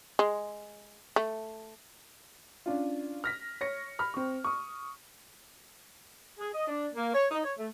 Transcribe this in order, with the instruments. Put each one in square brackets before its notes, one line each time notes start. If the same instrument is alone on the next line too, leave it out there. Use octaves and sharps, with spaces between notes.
[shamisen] G#3
A3
[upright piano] C#4 D4 F4
F6 A#6 B6
C#5 A#6 C#7
B5 F6
C4 C#6
C#6 D#6
[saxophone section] G#4
D#5
D4
A#3
C#5
D#4
C#5
A3